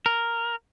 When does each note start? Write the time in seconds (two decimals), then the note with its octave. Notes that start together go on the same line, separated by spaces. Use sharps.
0.06 A#4